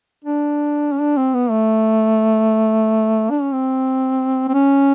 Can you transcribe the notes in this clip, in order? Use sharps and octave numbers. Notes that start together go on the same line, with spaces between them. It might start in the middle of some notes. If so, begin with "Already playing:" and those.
D4
C#4
D4
C4
B3
A3
D4
C#4
C4
C4
C#4